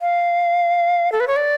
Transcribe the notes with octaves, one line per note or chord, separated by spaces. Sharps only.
F5
A4
B4
C#5
D5